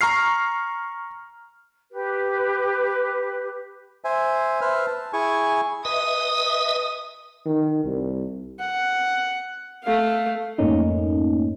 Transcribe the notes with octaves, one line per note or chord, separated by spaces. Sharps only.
A#5 C#6 F6 C7
G4 B4
C5 E5 G#5
B4 C5 E5 F6
A5
E4 G#4 G#5 C#6
B4 D#5 E5 D#6
D#3
C2
F#5
A3 F5
F2 G#2 A3 A#3 C#4 D#4